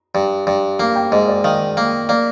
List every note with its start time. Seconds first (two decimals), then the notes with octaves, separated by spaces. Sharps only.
0.15 G2
0.47 G2
0.79 A#3 F5
0.96 G5
1.12 G#2 D#5
1.28 D5
1.44 D#3 F5
1.77 A#3
2.09 A#3 D5